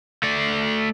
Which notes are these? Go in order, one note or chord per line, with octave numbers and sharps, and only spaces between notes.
A3 D5